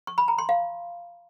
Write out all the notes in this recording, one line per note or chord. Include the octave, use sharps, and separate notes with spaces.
C#6
B5
A#5
C6
F5